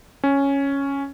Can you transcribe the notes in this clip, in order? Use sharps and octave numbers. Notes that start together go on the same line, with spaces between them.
C#4